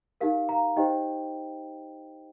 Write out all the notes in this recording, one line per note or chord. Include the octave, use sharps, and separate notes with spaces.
D#4 G4 A#4 F5
F5 A#5
D#4 G4 C5 D#5 G5